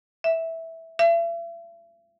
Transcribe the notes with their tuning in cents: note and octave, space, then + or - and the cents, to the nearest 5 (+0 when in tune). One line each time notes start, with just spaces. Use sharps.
E5 -10
E5 +40